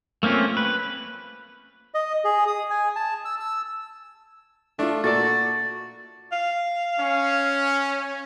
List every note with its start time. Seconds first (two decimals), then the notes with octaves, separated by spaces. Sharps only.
0.23 A3 A#3 C4 C#4 F4
0.57 B4
1.94 D#5
2.24 G#4
2.47 D#6
2.70 G#5
2.96 A5
3.25 E6
3.40 E6
4.79 A3 D4 F4
5.04 A#2 F#4 A4 D5 A6
6.32 F5
6.99 C#4